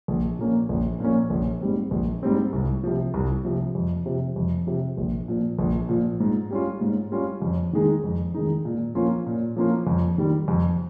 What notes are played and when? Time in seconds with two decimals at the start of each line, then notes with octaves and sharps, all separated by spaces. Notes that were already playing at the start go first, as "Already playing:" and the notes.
0.08 A#1
0.39 A#2 F3 A#3 C#4
0.69 A#1
1.00 A#2 F3 A#3 C#4
1.30 A#1
1.61 G#2 G3 C4
1.91 A#1
2.23 G#2 G3 C4
2.53 C2
2.83 C3 F3
3.14 C2
3.45 C3 F3
3.75 F2
4.06 C3 F3
4.36 F2
4.67 C3 F3
4.98 A#1
5.28 A#2 F3
5.59 A#1
5.89 A#2 F3
6.20 G#2
6.51 G3 C#4 F4
6.81 G#2
7.12 G3 C#4 F4
7.42 F2
7.73 D#3 G#3 D#4
8.04 F2
8.34 D#3 G#3 D#4
8.65 A#2
8.95 F3 A#3 C#4 F4
9.26 A#2
9.56 F3 A#3 C#4 F4
9.87 F2
10.18 D#3 G3
10.48 F2